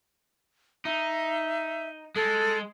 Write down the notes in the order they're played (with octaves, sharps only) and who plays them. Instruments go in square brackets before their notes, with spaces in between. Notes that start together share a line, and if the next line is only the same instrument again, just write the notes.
[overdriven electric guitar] D#4 [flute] E5
[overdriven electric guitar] G#3 [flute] A4